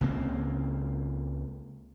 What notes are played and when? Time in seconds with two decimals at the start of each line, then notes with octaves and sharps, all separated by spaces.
0.01 C#2 C#3 A#3 C4